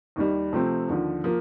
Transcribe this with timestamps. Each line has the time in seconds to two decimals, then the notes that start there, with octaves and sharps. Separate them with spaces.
0.16 D#2 D#3 G3
0.53 C3 F3 A3 C4
0.88 D#2 D3 F3
1.24 F3 A#3